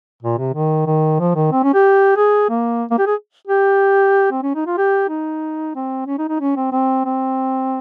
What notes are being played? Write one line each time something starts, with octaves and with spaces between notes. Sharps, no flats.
A#2
C3
D#3
D#3
F3
D#3
C4
C#4
G4
G#4
A#3
A#3
G4
G#4
G4
C4
C#4
D#4
F4
G4
D#4
C4
C#4
D#4
D#4
C#4
C4
C4
C4